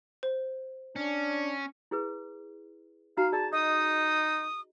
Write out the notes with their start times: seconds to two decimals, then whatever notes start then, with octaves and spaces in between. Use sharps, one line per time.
0.23 C5
0.96 C#4 D4
1.91 E4 G#4 B4
3.17 D#4 F#4 F5 A#5
3.32 G#4 D5 A5
3.53 D#4 D#5 D#6